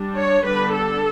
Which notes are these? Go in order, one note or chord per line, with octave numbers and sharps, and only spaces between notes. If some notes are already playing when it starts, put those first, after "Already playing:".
Already playing: G3 D4
C#5
D3 G3 B3 D4 B4
A4